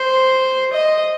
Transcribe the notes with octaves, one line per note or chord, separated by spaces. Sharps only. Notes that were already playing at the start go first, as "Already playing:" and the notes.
Already playing: C5
D#5